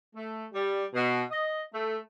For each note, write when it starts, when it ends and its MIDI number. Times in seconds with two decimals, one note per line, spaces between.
0.15 0.44 57
0.53 0.83 55
0.94 1.23 47
1.30 1.61 75
1.73 1.97 57